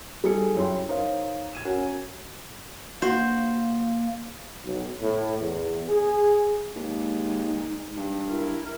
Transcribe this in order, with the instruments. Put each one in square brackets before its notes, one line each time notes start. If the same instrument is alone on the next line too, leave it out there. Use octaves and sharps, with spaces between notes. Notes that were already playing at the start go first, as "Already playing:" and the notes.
[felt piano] G3 D#4 G#4 A4 C#7
F#2 E4 C#5 G5 C6
D#4 A#4 C5 C#5 F5
G#6 D#7 E7
C#4 F#4 A#4
[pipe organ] A#3 [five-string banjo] F#4 [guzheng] C5
[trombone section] B1
A2
E2
G#4
[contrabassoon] D#2 [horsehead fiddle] G#3 D#4
[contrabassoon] G2
[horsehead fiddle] E4 A#4